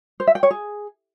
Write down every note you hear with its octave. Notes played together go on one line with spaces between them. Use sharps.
C5
E5
G5
C#5
G#4